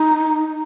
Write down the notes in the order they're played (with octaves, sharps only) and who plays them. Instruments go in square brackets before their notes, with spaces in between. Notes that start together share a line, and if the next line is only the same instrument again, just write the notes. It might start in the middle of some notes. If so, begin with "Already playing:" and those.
Already playing: [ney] D#4